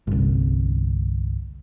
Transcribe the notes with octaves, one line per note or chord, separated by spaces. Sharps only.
G1 C2